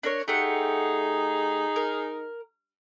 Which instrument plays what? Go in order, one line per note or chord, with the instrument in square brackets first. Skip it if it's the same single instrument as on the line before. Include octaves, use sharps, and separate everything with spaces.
[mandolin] D4 A#4 C#5
[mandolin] A3 G4 F#5 [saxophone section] D#4 G#4
[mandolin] A#4